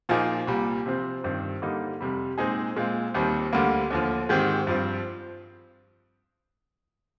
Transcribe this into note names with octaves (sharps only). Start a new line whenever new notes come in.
A#2 F3 A#3 D#4 G#4
C2 A#2 G3
C3 F3 C4
G2 D#3 G3 C4
D3 G3 A#3 D#4
F2 C3 G3
A#2 G#3 C4 D#4 G#4
A#2 G#3 C4 F4
D#2 D#3 G3 C4
D2 D3 G3 A#3
D#2 D3 F3
G#2 D#3 G#3 C4 G4
G2 F3 C4